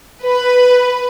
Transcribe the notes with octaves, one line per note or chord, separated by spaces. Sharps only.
B4